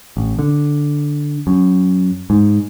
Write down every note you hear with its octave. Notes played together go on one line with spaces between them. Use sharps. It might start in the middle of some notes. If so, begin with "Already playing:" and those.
A1
D3
F#2
G#2